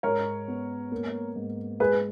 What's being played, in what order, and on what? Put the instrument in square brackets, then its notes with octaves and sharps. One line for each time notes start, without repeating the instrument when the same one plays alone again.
[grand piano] G#2 [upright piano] A#4 C#5
[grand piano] B3
A#3
G#2
[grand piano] G#3 [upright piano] G#4 B4